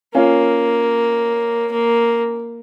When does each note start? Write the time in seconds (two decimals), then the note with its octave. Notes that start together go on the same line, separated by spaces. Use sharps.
0.15 A#3 C#4 F4
1.71 A#3